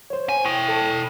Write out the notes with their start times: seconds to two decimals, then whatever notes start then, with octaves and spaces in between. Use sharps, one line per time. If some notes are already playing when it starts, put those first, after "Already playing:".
0.10 C5 C#5
0.29 G#5
0.45 E4 G5 C#6
0.68 A4 A5